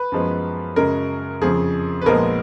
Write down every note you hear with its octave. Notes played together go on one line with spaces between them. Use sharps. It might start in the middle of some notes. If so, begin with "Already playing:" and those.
Already playing: B4
F#2 F3 G#3 B3
F#2 C#3 G#3 A#4
F2 C#3 F3 G#4
B4
A#1 A#2 F3 G#3 B3 A#4